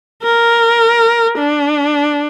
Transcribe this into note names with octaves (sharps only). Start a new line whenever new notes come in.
A#4
D4